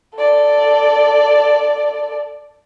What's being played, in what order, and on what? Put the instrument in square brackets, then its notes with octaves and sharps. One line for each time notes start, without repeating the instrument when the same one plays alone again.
[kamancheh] A4 D5